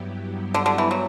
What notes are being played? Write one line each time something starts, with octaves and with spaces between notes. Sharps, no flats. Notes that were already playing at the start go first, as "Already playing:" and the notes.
Already playing: G2 F#3 B3 E4 G4
D3
D3
E3
F#3